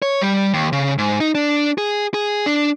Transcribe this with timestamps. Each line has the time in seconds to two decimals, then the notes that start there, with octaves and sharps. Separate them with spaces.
0.02 C#5
0.21 G3
0.54 D#2
0.73 C#3
0.98 G#2
1.20 D#4
1.35 D4
1.78 G#4
2.14 G#4
2.46 D4